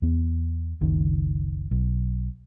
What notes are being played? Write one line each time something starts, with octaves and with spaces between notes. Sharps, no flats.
E2 B3
F#1 C#2 D#3
B1